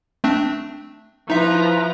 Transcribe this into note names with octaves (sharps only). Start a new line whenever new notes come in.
A3 C4 D4
F3 D#4 E4 B4 E5 A#5